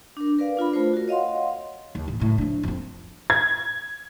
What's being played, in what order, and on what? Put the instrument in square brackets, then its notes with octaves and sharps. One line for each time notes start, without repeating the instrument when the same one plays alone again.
[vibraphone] D4 A#4
A#4 B4 D5 F5
D4 F4 A#4 B5
A3 F4 A#4 C5
F#4 A#4
C#5 D#5 F5 F#5 C6
[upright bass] D#2
A1
F#2 A2
F3 D4
F2 C4
[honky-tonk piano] G#6